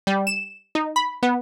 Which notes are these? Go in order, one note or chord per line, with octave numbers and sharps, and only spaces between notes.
G3
E7
D#4
B5
B3